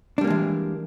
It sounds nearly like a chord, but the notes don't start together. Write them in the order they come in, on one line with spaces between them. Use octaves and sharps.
D4 G3 A#3 G#3 E3